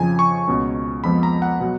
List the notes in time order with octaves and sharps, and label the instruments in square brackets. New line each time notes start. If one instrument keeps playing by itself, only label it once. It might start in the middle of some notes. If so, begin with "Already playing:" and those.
Already playing: [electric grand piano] F2 C#3 F3 G#5
C#6
C#2 B2 A#3 C#4
F2 F3 G#3 B3 B5
A#5
F#5
B2 F#3